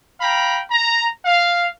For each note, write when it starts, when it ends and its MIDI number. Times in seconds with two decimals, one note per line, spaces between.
0.20 0.61 77
0.20 0.61 79
0.20 0.61 82
0.20 0.61 83
0.71 1.07 82
1.25 1.68 77